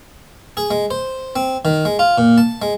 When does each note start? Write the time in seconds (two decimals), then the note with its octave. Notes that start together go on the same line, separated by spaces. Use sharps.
0.57 G#4
0.71 G#3
0.91 C5
1.36 C4
1.65 D#3
1.85 G#3
1.99 F4
2.18 A#2
2.38 A5
2.62 G#3